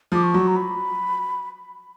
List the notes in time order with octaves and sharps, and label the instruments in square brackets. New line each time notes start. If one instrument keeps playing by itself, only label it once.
[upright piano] F3 [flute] D6
[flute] C#6
[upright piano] F#3
[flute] A#5
B5